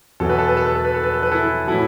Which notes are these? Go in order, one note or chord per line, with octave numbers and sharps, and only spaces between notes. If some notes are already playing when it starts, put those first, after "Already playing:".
E2 B2 F#3 A4
B4
A4
B4
A4
B4
A4
B4
A4
B4
A4
B4
E4 A4
A2 F#3 E4 A4